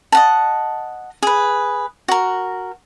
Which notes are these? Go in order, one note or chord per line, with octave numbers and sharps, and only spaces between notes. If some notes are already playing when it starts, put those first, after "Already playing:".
D#5 F#5 A5
G#4 B4
F#4 A#4